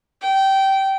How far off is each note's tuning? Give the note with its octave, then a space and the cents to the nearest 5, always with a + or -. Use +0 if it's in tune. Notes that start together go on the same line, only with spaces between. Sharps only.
G5 -20